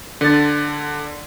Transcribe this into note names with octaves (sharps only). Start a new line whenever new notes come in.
D3 A6